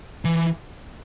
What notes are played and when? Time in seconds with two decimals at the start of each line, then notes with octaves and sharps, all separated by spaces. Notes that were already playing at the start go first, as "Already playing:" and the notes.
0.25 E3